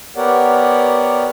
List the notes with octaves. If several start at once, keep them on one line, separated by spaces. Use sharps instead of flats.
B3 G4 A#4 C#5 D5 F#5